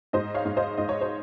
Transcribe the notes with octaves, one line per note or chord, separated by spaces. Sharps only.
G#2 C5 D#5
C#5 F5
G#2
C5 D#5
G#2 D#5
C#5
C5